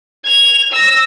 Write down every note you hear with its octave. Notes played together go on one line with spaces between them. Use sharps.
G#6 F7
E6 A#6